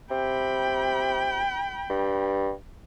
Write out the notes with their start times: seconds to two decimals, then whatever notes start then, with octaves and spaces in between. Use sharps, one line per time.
0.11 C3 G5 B5
1.90 G2